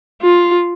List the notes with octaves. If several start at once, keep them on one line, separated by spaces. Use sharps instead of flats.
F4